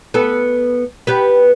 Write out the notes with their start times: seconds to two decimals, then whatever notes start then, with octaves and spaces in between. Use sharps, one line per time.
0.14 B3 A4
1.07 B3 G4 B4